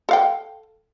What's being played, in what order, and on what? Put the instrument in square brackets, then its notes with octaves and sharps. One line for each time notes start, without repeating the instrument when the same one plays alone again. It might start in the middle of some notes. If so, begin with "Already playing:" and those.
[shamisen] A4 F5 G5